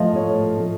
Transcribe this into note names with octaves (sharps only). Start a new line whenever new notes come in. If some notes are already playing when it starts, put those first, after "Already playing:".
Already playing: A2 F3 A3 D#5 F5
A2 C#5
F3 A3